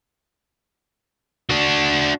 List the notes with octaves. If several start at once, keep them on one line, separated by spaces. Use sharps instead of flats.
D4 F#4